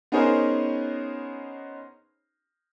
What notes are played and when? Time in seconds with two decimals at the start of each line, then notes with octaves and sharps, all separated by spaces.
0.12 B3 C#4 D#4 G#4 A#4 C5